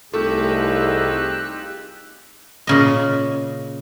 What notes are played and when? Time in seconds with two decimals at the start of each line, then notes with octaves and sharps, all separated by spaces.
0.13 C2 A3 D#4 F4 G4 G#4 E6 F#6
2.67 A#2 C#3 D#5